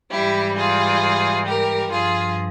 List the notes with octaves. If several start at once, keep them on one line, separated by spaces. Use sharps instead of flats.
G#2 E3 G3 E4 G4
F4 G#4
G4 A#4
G2 F3 F4 G#4